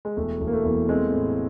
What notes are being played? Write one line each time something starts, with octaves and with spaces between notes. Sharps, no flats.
G#3
E1 A3
E1
A#3
A3
E2
G#3 C4
A2